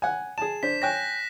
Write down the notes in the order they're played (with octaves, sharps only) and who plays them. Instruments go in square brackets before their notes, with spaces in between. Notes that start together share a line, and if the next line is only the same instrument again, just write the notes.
[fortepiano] F#5 G#5
[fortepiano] G#4 A5 [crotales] E7
[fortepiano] D4 C5 [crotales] B6
[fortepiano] C#5 G5 G#5 [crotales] F#6 A#6